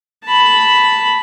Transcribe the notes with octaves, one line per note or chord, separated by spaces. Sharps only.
A5 B5